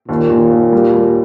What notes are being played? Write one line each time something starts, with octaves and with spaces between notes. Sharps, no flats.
D#2 A#2
D#2
D#2
G3
G3